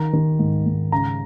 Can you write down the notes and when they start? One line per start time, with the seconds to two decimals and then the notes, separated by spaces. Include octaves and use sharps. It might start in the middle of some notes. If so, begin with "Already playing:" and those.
Already playing: D#3 A#5
0.13 D#3
0.39 G#2
0.66 G#2
0.92 C#3 A#5